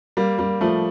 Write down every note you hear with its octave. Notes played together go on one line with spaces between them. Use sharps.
G3 A#3
G3 A#3
F3 A3